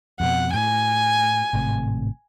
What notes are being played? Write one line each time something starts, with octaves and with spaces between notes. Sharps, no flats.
F2 B2 F#5
A2 G#5
G#1 A2 C3